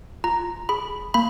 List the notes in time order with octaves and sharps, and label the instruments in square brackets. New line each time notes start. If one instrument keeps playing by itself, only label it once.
[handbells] F4 A#5
G#4 B5
A#3 B5